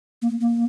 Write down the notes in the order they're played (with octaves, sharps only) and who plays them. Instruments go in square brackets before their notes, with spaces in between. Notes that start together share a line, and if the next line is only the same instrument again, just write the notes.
[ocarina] A#3
A#3